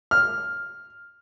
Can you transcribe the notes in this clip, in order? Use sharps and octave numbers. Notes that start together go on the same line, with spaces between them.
F6